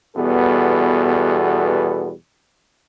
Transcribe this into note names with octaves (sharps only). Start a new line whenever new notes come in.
E2 B2 G3 B3 A4